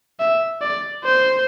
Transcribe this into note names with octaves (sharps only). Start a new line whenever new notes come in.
E5
D5
C5